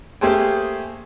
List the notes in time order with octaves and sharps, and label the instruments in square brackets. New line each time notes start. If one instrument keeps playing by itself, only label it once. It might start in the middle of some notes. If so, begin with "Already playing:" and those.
[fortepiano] A3 A#3 G4 G#4 C5 G5